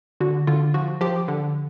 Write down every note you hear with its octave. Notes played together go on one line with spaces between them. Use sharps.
D3 F#4
D3 F4
F3 F#4
F3 G4
D3